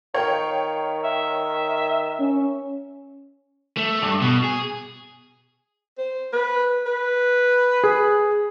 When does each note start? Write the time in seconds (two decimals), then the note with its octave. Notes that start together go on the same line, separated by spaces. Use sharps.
0.14 D#3 C#5 F5 G5
1.04 E5
2.20 C#4
3.78 A3
4.02 G2
4.21 B2
4.44 G#4
5.98 C5
6.33 B4
6.87 B4
7.84 G#4